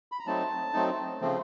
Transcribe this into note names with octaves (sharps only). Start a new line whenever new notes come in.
B5
A#5
F#3 A3 C4 D#4 A5
F#3 A3 C4 D#4
C#3 F3 A3 C4